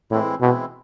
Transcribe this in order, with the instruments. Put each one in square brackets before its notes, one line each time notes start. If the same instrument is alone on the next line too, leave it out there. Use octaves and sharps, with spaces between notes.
[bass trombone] A2 [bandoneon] E3 G#3 C4 E4
[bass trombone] B2 [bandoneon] E3 G#3 C4 E4